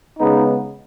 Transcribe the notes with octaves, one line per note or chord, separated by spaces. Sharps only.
C#3 G#3 B3 D#4